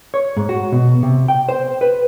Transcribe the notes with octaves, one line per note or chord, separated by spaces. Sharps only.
C#5
G#2
F#4
B2
C3
G5
C5
B4